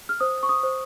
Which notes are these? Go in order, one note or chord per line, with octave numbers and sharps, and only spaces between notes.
F6
C5 D#6
C#6
D#6
C5